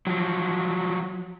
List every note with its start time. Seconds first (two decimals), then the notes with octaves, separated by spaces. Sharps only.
0.07 F3 F#3